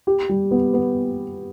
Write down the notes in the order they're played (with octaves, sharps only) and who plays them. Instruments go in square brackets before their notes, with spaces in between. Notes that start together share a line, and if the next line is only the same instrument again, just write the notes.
[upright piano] G4
G3
B3
B3